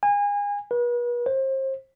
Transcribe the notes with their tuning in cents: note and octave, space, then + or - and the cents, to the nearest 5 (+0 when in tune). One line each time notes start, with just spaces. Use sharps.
G#5 -30
B4 -40
C5 +35